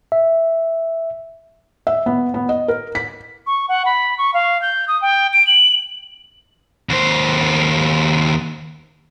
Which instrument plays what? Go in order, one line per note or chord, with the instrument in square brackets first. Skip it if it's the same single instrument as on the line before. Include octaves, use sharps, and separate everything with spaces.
[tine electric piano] E5
[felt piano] E5
B3
B3
D#5
A#4
B6
[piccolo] C#6
F#5
B5
C#6
F5
G6
D#6
G5
D7
F#7
[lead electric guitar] D#2 C5